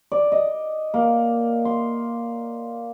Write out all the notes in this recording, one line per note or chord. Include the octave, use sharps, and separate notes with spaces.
D5
D#5
A#3
C6